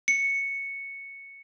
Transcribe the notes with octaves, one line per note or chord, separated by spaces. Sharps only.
C#7